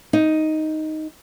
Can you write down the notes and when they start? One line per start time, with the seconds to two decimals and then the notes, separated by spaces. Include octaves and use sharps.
0.13 D#4